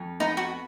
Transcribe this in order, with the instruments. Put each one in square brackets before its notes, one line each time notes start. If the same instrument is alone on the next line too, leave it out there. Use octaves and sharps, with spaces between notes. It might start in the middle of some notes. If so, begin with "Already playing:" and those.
Already playing: [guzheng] F2
[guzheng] B3 [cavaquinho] D#4
[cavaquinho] F#4